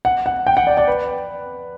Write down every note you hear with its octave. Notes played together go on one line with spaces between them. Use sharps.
F#5
F#5
G5
F#5
D5
D5
B4